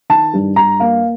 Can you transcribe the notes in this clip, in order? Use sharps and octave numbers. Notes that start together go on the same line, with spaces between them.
D#3 A5
G2
G2 A#5
A#3 F5